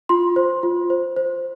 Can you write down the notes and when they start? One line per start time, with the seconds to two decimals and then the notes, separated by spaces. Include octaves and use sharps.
0.09 F4 C6
0.36 C5
0.63 F4
0.90 C5
1.16 C5